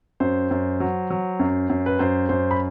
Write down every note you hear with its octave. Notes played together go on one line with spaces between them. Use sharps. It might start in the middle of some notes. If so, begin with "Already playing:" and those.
F#2 C5
F#2
F#3
F#3
F#2
F#2
B4
F#2 C5
F#2 C5
B5